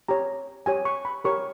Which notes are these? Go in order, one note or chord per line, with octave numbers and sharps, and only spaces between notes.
G4 C#5 A#5
G4 C#5 G#5
C#6
B5
G4 A#4 C#5 C#6